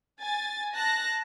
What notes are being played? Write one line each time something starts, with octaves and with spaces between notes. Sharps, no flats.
G#5 A6
A5 F#6 A#6